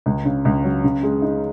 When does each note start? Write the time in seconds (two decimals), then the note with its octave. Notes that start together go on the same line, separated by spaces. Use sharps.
0.06 C#2
0.25 C#3
0.45 C#2
0.64 F#3
0.84 C#3
1.03 G#3
1.22 D#4